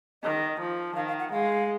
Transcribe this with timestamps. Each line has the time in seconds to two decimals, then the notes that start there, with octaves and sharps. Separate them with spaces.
0.23 D#3 D#5
0.59 F3
0.96 D#3 F5
1.08 F5
1.20 F#5
1.32 G#3 F5